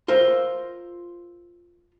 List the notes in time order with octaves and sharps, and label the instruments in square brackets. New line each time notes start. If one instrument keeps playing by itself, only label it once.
[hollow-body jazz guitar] F4 A#4 C5 E5